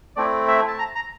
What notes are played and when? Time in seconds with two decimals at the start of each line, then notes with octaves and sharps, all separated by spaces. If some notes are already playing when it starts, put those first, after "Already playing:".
0.16 A3 C4 E4 D5
0.48 E5
0.68 A5
0.79 A#5
0.95 A#5